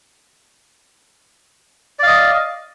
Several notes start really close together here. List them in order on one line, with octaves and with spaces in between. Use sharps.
D5 F5 D#5